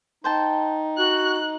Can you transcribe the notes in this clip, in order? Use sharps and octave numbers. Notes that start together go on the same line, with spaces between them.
D#4 C5 G5 A5
F#4 F#6